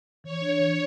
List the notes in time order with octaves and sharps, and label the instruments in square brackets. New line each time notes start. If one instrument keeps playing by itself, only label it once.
[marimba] E3 [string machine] C#5
[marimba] D4
E3